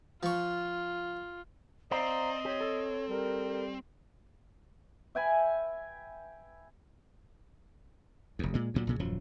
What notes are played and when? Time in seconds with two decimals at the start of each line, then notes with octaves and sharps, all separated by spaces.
0.23 F3 F4 C#6
1.91 C4 C5 D5 D#5 F5 A#5
2.45 G4 C#5
2.61 A4
3.10 G3 A#4
5.15 E5 G5 G#5 B5
8.39 F1 D#2
8.54 A#2 G#3
8.74 D2 A#2 F#3
8.87 B1 A#2 C#3
8.99 D#1 F#2 F3 F#3